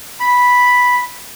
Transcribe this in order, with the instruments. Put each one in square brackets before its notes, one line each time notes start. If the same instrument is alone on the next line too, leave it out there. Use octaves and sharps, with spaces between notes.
[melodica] B5